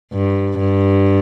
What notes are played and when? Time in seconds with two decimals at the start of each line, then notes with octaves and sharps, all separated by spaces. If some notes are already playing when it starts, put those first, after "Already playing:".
0.12 G2
0.59 G2